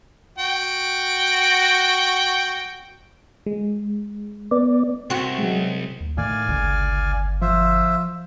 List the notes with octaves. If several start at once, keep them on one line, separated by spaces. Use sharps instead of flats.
F#4 G5
G#3
B3 D5
C2 C4 F#4
F#3 G#3
D#2
A2 D#3 D5 F5 G#5
G1 C#2
F3 F4 C5 E5